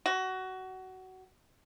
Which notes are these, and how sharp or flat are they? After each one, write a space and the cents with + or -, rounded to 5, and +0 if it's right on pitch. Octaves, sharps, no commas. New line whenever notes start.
F#4 +20